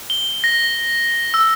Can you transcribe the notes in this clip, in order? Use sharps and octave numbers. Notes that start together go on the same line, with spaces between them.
G7
A#6
E6